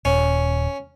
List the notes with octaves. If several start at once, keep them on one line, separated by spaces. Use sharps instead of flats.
D#1 C#4